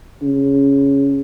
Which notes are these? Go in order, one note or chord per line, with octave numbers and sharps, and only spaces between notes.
C#3